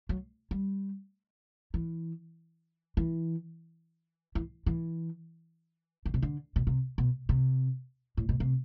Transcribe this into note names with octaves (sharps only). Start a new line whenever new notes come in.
F#3
G3
E3
E3
E3
E3
D3
C3
D3
B2
C3
B2
C3
A2
B2
C3